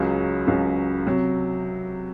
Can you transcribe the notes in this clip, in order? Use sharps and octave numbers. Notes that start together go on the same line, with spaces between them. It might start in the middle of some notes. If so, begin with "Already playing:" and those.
Already playing: C#2 C#3 F#3
C#2 C#3 F#3
C3 F#3